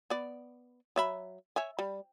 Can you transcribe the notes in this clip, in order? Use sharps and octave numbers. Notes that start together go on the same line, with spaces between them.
B3 D5
F#3 E5 B5
C#5 E5 G#5
G3